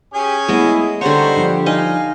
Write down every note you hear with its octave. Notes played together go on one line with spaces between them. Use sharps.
C#4 G4 G#4 G#5
G#3 A3 B3 E4 D#5
D3 G3 D#4 F#4 G4 C5 C#5
F3 D4
D#4 D#5 F5 G#5